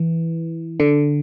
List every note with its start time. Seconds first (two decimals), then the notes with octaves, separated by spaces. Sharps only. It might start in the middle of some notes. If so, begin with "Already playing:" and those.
Already playing: E3
0.80 D3